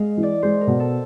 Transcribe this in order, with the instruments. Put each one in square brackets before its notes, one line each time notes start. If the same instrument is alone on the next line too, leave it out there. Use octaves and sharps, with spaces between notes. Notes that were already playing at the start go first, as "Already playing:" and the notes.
Already playing: [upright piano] G#3 [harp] D#5 F5
[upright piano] E3
[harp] D5
[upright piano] G#3 [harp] C5
[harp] A#4
[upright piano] B2
[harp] A4